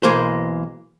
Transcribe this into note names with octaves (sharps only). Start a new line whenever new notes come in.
B1 E3 G#3 A#3 C5